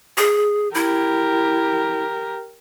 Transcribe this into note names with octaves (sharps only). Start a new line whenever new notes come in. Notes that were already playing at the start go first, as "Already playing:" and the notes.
G#4
E4 G4 A#4